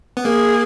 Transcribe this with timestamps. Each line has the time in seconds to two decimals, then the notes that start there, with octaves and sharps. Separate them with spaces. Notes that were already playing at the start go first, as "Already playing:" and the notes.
0.17 B3
0.25 A#3 G#4